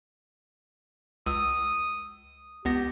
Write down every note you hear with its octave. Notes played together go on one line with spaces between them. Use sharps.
C#2 D#6 E6
C#2 B3 G4 A#6